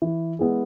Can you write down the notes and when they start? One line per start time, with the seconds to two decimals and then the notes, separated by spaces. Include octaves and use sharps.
0.02 E3
0.39 G#3 B3 E4 G#4